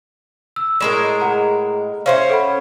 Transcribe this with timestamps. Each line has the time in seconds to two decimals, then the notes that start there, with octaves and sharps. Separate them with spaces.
0.56 E6
0.81 A2 G#3 A#4 E7
1.20 G#4 F#5 A#5
2.06 C#4 C5 C#5 E5 F5
2.30 A4 F#5 B5